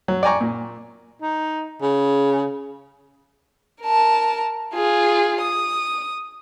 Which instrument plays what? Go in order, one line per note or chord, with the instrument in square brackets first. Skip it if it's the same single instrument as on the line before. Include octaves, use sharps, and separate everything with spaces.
[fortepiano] F#3
D5 G5 G#5 A#5 C#6
A#2
[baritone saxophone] D#4
C#3
[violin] A#4 A5
F4 G#4
D#6